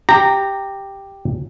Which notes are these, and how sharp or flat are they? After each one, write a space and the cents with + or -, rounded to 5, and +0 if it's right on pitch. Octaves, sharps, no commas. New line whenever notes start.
G4 +0 A#5 -15